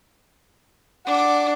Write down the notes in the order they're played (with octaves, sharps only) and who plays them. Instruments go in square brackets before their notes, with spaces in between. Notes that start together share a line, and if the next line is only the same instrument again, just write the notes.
[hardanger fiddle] D4 [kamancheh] F#5 D6